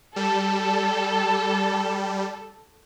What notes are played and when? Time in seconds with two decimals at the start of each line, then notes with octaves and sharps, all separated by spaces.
0.16 G3 A4